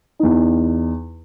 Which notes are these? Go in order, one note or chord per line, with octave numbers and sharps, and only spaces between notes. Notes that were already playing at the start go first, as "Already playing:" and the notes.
E2 D#4